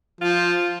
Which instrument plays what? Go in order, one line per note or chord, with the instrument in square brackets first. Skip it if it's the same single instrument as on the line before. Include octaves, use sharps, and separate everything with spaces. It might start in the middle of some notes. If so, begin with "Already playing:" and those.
[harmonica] F3 [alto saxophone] F4